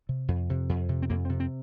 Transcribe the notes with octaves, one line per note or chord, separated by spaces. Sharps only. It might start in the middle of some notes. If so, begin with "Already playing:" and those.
C3
F2
C3
F2
C3
C4
F2 A#3
C4
C3
C4